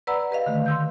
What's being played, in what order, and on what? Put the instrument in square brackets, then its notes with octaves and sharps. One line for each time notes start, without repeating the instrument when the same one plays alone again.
[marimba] B4 D5 F#5 A#5 B5 E6
G4 B4 D#5 F5
D3 D#3 A3
C6 E6 G6